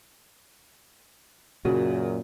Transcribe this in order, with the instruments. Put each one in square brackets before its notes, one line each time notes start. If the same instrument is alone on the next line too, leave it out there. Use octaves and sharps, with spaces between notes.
[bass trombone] F#2 [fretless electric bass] A#2 [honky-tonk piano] C#3 [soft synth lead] F#4